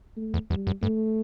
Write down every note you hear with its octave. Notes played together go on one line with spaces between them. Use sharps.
A3
E2
E2 G3
F#2
G2 A3